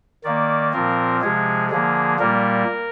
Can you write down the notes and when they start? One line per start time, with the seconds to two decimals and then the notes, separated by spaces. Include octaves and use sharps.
0.24 D#3 A#3 D5
0.73 A#2 F3 C4 A#4
1.21 C3 F3 G#3 G#4
1.70 D3 F3 A#3 G#4
2.19 A#2 G3 A#3 A#4